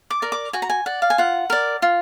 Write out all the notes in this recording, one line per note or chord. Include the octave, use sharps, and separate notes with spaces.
D6
A#4 D5
D6
F#4 G#5
A#5
G#5
D5 F#5
F5
G#5
F4 F#5
A#4 D5
F4